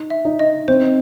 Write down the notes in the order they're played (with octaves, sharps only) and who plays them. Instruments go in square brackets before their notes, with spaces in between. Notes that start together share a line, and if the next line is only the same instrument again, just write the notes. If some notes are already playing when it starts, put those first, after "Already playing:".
Already playing: [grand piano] D#4
[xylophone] E5
[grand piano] D#4
[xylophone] D#5
[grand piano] C4 [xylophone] C5